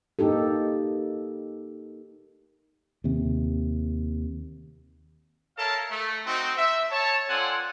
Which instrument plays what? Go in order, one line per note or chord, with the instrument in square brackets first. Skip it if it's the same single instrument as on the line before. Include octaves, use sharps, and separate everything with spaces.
[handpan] A#3 D#4 G4 A4
[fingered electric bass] D#2 C3
[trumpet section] A4 A#4 C#5 E5 F5 A5
A3
C4 D#4 F#4
E5
C#5 A5
C4 F4 A4 D5 F#5 G#5